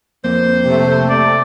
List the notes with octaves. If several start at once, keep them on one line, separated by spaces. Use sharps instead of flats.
F2 A#3 C4 C5
C3 A3
D5